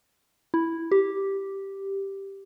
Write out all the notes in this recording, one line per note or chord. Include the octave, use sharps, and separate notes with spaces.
E4
G4